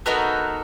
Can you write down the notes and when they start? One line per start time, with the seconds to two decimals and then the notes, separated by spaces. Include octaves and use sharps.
0.06 B3 D#4 F#4 A4 A#4